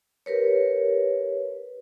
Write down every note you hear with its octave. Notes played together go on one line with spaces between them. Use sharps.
G4 A#4 B4 C#5